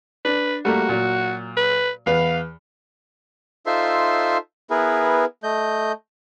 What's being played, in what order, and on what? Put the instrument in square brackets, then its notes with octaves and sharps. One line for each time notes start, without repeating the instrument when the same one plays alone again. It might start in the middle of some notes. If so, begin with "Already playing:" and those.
[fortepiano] D4 [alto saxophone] B4
[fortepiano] G3 A3 A#3 [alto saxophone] F#4
[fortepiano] A#2 F#3
[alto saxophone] B4
[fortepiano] E2 B4 [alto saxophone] F5
[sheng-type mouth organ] D#4 F4 A4 C5 E5 C6
B3 E4 G#4 A#4 B4
A3 D#5 G6